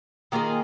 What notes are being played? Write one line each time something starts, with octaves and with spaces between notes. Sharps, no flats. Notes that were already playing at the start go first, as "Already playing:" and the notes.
D#3 A#3 F4 G#4